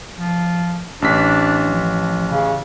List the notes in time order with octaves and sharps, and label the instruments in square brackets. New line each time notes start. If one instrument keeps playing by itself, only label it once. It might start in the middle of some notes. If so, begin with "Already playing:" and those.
[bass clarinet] F3
[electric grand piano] A1 B6 [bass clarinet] D4
[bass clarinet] F3
C#3